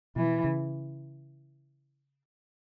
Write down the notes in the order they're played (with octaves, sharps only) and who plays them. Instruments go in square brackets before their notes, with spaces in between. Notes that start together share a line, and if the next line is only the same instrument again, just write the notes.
[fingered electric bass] B2 [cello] E3
[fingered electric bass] C#3